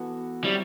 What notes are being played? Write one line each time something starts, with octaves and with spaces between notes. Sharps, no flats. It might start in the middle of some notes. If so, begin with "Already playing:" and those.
Already playing: E3 B3 F#4 A4
F#3 G3 C4 E4